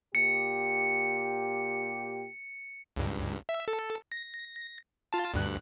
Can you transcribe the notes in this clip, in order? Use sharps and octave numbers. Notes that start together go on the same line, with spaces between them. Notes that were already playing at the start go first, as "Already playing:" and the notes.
A#2 G4 C#7
C#2 G2
E5
A4
A#6
F4 A5
D2 G2 F#6